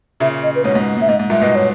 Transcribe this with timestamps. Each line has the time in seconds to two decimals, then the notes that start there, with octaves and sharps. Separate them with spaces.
0.20 A#2 C#3 E5
0.43 D#5
0.55 B4
0.64 G#2 B2 C#5
0.75 G#2
0.97 G#2
1.01 E5
1.08 G#2 D#5
1.19 G#2
1.30 G2 A#2 E5
1.41 G#2 B2 D#5
1.56 C#5